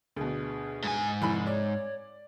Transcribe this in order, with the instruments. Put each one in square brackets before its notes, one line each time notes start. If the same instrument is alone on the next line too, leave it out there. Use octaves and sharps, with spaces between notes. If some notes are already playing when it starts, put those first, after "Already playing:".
[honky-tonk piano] D2 B2 [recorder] G#4
[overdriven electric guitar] G#2 G#5
[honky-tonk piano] F1 B5 [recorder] E4
[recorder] C#5 [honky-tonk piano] D5